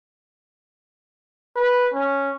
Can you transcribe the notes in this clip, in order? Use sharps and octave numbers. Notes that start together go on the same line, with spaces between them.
B4
C#4